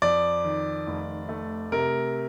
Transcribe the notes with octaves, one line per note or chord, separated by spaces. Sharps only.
F2 D5
D#3
F1
A3
C3 A#4